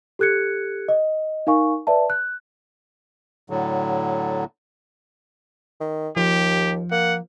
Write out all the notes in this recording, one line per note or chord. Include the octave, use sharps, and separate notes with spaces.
G4 A4 F#6 G#6 C#7
D#5
D#4 A#4 F5 G#5 C#6
B4 D5 E5 A5
F#6
A2 D3 F#3
D#3
D#2 F3 G4
A#3 F#5